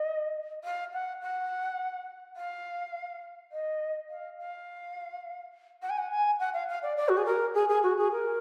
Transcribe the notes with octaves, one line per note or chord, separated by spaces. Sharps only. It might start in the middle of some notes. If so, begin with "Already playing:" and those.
Already playing: D#5
F5
F#5
F#5
F5
D#5
F5
F5
F#5
G#5
F#5
G#5
F#5
F5
F5
D5
D5
F#4
G#4
A#4
G#4
G#4
F#4
G#4
A#4